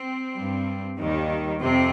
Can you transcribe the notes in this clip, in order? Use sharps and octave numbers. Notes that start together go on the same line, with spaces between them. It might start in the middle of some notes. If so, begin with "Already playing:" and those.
Already playing: C4
G2 G3
D#2 D#3 G3
F2 C3 C4